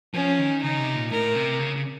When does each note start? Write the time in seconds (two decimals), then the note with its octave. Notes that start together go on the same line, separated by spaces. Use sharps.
0.14 F3 C#4
0.39 D#3
0.62 C#3 D#4
0.79 C3
0.95 A#2
1.11 A2 A#4
1.35 C3
1.59 C#3
1.76 C#3